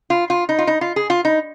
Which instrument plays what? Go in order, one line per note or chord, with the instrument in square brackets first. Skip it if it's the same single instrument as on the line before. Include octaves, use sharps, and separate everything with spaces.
[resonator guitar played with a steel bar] F4
F4
D#4
F4
D#4
F4
G#4
F4
D#4